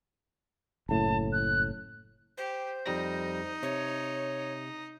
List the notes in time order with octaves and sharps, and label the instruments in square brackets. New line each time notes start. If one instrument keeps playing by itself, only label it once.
[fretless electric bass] F#1 A2 [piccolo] A5
[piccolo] F#6
[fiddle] G4 [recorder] C5
[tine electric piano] F2 G3 A#6 [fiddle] D#4
[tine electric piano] C3 [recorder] C#5